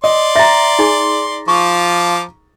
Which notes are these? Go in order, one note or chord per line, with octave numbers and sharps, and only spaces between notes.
D5 D#5 C6
E5 A#5 A6
D#4 G#4 G#5
F3 F4 C#6 D6